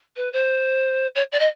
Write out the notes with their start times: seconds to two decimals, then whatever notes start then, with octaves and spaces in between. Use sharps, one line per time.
0.16 B4
0.33 C5
1.15 C#5
1.32 D5
1.39 D#5